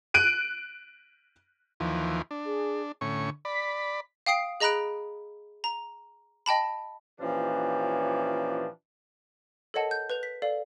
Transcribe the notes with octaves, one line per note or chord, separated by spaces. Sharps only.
F#6 D7 D#7
D#2 E3 F3
D4
G#4
A2 D3 C#4 C#6
D5 B5 B6
F5 G5 D#6 C7 D7
G#4 D#5 A#5 B5 F#6 D7
A#5
D#5 G5 A5 B5
A#2 E3 F3 C#4 D4 G4
A4 A#4 C#5 D#5 F#5 A5
G6
B4 G6 F7
B6
A4 D5 F5